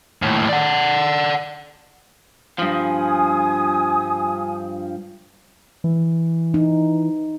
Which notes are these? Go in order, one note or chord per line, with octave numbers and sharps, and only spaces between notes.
D#2 A2
D5 F#5
G2 F3 G#5 D#6
E3
D#4